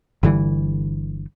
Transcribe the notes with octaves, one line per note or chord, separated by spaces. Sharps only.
G1 D3 E3 G3